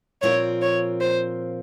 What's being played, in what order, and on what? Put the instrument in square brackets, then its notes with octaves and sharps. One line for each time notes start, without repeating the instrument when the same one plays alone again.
[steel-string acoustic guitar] A#2 F3 C4 F4 A#4 [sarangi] C#5
[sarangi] C#5
C5